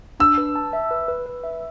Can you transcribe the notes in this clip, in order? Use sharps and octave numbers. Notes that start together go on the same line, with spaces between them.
D4 E6
B4
A5
E5
B4
B4
B4
E5